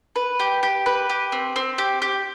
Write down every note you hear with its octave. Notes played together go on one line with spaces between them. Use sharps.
B4
G4
G4
B4
G4
C4
C4
G4
G4